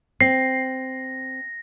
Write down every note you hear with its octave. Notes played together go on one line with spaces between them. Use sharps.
C4 A#6 C7